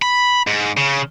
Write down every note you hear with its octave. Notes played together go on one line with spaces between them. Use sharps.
B5
G#2
C#3